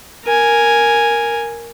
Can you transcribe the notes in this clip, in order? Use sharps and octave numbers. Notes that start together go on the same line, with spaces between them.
A#4 G#5